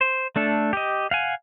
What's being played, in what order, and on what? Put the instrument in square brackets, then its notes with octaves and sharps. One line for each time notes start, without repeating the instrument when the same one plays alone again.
[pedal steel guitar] C5
A3 D4 A4
G4 D#5
F5 F#5 G#5